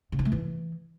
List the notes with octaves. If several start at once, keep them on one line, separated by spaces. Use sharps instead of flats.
C#3
F4
A3
E3